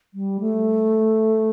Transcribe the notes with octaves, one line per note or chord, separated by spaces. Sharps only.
G3
A3